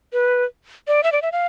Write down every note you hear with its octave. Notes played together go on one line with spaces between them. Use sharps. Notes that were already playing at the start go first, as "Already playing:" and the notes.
B4
D5
E5
D5
E5
F5